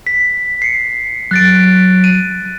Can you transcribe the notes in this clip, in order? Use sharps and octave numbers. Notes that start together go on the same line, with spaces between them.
B6
C7 C#7
F#3 F#6 A6 D7
D#7